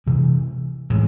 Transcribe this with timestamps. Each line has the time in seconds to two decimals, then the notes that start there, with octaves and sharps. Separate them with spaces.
0.06 C3 E3 G#3
0.90 A2 E3 G#3